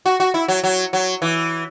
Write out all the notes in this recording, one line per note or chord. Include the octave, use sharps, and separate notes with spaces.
F#4
F#4
E4
F#3
F#3
F#3
E3